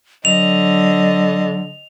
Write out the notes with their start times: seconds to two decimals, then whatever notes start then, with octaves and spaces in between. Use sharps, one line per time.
0.25 D3 F#3 D#5 F7